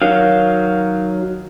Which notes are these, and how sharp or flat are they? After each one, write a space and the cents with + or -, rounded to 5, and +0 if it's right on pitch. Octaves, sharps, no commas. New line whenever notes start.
D#3 +10 F#3 +5 F5 +0